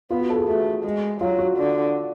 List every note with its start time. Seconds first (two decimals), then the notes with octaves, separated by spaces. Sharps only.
0.10 B3 F4
0.20 F#4
0.30 A4
0.38 G#4
0.48 A3 F#4
0.84 G#3
1.21 F#3 F4
1.39 F#4
1.57 D3